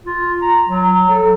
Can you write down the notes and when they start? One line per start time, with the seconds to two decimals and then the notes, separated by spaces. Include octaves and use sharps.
0.06 F4
0.42 A#5
0.69 F#3
1.10 A4